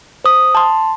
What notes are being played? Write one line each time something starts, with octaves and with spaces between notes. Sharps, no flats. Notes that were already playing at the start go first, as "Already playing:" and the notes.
C5 D#6
A5 C6